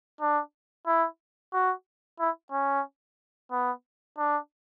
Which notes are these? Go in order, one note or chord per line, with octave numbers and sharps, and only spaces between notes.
D4
E4
F#4
E4
C#4
B3
D4